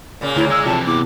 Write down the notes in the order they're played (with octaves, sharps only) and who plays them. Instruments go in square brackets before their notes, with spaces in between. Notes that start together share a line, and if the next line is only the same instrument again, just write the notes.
[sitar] A#2 C#3 A#3
[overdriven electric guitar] D2 [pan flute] E4
[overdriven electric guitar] G#3 [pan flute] E6
[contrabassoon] F2 [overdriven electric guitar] C3 E3 [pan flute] A5
[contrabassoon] E2 [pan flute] D6